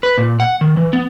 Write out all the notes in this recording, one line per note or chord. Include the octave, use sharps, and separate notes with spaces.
B4
A#2
F#5
D#3
E3
B3